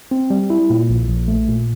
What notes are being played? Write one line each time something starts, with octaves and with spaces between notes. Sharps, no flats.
C4
G3
E4
A#2
A#1
A#1
A3
A#2